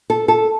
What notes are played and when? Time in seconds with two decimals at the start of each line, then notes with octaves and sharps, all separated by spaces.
0.10 A4
0.28 A4